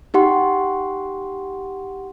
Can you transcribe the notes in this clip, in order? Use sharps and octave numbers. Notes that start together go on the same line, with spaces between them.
D#4 G4 F#5 C6